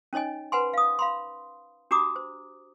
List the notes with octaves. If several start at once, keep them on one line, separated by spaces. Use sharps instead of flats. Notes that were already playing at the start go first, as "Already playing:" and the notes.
C#4 D#4 C#5 D#5 G#5
B4 C5 F#5 G#5 B5 C6
F5 D#6
F5 B5 C6
D4 F#4 G4 A#5 D6 D#6
C5